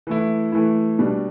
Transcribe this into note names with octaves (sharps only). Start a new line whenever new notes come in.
E3 A3 E4
E3 A3 E4
B2 G3 D4